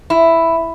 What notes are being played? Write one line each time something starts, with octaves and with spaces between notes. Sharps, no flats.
E4